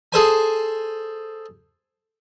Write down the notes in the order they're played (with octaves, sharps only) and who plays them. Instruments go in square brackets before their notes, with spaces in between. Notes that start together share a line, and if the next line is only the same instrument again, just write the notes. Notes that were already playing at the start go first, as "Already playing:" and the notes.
[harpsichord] G#4 A4 C5 G#5